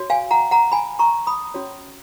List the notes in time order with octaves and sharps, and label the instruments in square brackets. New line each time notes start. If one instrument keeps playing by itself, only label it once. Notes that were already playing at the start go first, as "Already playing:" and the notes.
Already playing: [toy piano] F#4 C#5
F5 G#5
F#5 A#5
F#5 A#5
G#5 B5
A#5 C#6
B5 D#6
C#4 F#4 C#5